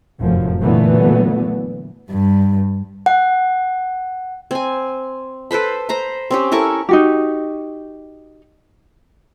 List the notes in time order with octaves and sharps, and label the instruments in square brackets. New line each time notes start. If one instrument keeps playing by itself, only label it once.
[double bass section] F1 F#2 A2 F3
A#2 D3 E3 F#3 A3 B3
[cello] G2
[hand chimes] F#5
[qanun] C4 G#5
A4 B4 C5 B5
C5 A#5 B5
C4 C#4 G4
E4 A4 A#4 C#6
[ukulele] D#4 F#4 G4